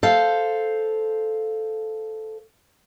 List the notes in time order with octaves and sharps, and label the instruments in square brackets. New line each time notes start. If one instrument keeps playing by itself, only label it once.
[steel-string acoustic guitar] A4 C5 F5